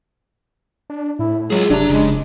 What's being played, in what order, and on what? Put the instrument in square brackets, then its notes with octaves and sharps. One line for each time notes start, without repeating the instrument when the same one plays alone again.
[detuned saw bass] D4
[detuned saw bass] A2 [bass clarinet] E4
[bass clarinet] F#3 [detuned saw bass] G#3 [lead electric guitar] F4 G#4
[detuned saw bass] F#1 [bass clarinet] C3 [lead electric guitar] F#3 A#5 [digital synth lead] D4
[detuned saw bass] F1 [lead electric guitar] C#3 [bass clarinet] G#3